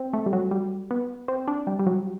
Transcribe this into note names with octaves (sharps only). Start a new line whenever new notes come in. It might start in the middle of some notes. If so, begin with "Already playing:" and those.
Already playing: C4
A3
G3
F#3
G3
B3
C4
D4
G3
G3
F#3